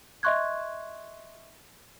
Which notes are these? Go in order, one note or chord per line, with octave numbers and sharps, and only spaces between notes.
D#5 E5 C6 C#6 F#6 G#6